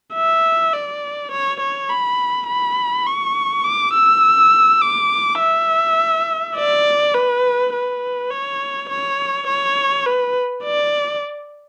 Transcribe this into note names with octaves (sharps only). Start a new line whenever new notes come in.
E5
D5
C#5
C#5
B5
B5
C#6
D6
E6
D6
E5
D5
B4
B4
C#5
C#5
C#5
B4
D5